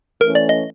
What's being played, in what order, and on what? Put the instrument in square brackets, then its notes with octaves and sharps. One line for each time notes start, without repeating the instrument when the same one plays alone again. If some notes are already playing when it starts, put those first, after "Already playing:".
[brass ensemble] E3 A3 C#4 [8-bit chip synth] A#4
[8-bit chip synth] D5
D#5